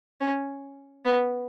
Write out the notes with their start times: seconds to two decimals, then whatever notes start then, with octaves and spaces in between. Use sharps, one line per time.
0.21 C#4
1.05 B3